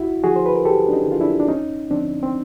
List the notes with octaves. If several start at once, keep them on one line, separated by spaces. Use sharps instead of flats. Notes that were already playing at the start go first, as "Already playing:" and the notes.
Already playing: D2 E4 F#4
D3 F3 F#4 G#4
C5
B4
A#4
D2 G4 A4
D4
C#4 D#4
D3 F3 F4
D4 E4
D4
D2 C#4 D#4
D3 F3 C4 D4
C4